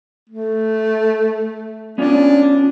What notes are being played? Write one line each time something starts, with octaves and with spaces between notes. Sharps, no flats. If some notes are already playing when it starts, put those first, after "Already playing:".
A3
B3 C#4 D4 F4